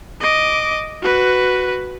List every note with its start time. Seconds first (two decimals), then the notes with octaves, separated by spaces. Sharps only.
0.21 D#5 D6
1.02 F#4 B4